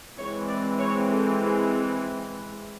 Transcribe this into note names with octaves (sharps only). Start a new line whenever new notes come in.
E3 G#3 C4 C#5
D5
C#5
A4
G#4